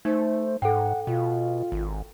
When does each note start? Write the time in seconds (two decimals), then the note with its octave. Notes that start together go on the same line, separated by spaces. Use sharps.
0.05 A3 D#4 C5
0.62 G#2 A4 F#5 G5
1.07 B2 F4
1.72 G#1